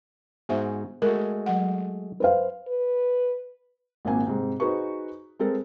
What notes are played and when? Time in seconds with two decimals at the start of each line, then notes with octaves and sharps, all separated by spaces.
0.49 G#2 B3 F#4 G#4 C5 E5
1.02 G#3 A3 F#4 A#4
1.46 F#3 F#5
2.20 B4 C5 F5
2.68 B4
4.05 G#1 A#2 A#3 C4 G#5
4.27 G#2 C3 C4
4.60 D#4 F#4 G#4 B4 C5 C#6
5.39 G#3 C4 A4 A#4